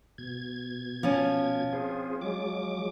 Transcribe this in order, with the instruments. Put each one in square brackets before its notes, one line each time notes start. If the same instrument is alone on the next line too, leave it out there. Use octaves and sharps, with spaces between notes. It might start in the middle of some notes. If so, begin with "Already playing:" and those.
[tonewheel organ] B2 G#6
[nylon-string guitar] F3 C#4
[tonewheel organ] C4 F4 G#4
F#3 G#3 D6